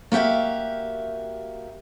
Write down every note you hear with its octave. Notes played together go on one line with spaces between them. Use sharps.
A#3 F#4 G4 E5 F5